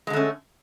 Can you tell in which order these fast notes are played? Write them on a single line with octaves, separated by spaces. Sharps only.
G#3 D3 A3 C#4